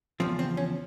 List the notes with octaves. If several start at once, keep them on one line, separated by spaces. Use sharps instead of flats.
E2 C#3 F3 C4
C4
C#4